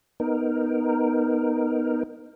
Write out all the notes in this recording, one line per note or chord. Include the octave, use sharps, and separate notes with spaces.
B3 D#4 A#4